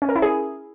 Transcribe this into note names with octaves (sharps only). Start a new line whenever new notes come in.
C#4
A#4
E4
G#4